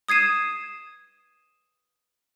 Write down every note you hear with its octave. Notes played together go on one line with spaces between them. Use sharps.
D#6 G#6 C7 D#7 E7